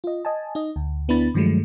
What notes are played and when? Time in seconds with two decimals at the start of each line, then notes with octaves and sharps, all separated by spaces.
0.04 F4 D#5
0.25 D#5 G#5 A5
0.55 D#4 D#5
0.76 D2
1.08 D2 B3 D4 E4 B5 A6
1.34 G2 D#3 F3 F#3 G#3 A3